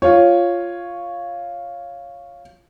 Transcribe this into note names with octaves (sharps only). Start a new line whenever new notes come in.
F4 C#5